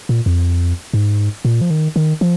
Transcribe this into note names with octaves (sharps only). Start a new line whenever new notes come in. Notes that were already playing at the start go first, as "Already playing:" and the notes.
A#2
F2
G#2
A#2
F3
D#3
D#3
F3